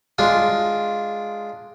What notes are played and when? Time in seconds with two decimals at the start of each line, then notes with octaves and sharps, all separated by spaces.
0.18 G#3 D4 F4